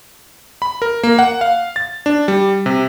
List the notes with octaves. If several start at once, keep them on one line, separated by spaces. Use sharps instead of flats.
B5
A#4
A#3
F#5
F5
A6
D4
G3
C3